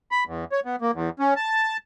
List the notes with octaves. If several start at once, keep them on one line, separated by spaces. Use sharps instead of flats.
B5
E2
C#5
B3
A#3
E2
C#4
A5